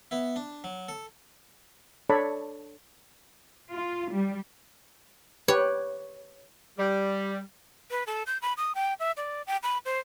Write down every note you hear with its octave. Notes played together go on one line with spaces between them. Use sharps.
B3 E4
D4
F#3
A4
D4 A4 C#5 D5 A5 B5
F4
G3
G4 B4 C#5
G3
B4
A4
G6
B5
D#6
G5
E5
D5
G5
B5
C5